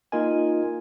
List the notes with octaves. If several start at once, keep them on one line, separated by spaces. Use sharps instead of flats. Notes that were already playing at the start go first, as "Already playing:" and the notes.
A#3 D#4 F4 A#4 D#5 G#5